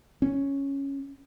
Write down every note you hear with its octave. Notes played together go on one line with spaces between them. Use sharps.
C#4